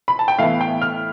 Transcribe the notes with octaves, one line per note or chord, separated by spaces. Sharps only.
B5
A5
G5
A2 E3 B3 E4 F5
G5
F6